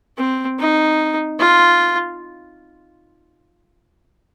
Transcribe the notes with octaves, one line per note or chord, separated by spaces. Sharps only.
C4
D#4
F4